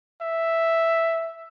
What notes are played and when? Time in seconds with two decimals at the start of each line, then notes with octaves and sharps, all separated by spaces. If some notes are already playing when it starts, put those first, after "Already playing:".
0.21 E5